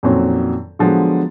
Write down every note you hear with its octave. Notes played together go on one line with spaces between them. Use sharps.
F2 A#2 D#3 F#3 C4 C#4
D3 F3 F#3 G#3 B3